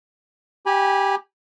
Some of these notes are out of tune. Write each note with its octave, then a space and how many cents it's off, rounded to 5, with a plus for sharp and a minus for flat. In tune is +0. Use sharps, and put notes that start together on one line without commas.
G4 +0 G#5 -20 B5 -30